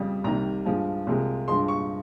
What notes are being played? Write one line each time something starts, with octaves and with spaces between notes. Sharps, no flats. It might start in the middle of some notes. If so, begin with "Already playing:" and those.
Already playing: F2 C#3 G3
C2 C3 D#3 G3 A#5
G2 F3 G#3
C2 C3 F3 G#3
G2 F3 G#3 C6
C#6